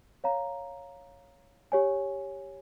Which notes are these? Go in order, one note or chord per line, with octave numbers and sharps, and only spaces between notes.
C#5 F5 A#5
G4 C#5 G#5